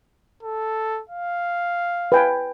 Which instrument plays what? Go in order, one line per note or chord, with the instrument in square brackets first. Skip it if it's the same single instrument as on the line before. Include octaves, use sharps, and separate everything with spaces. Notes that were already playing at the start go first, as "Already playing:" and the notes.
[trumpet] A4
F5
[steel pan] B4 G5 G#5